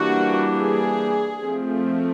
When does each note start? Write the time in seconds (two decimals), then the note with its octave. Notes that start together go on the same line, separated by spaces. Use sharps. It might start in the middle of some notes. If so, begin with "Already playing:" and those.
Already playing: E3 G3 A#3 D4 F#4
0.59 G#4
1.42 F3 A3 C4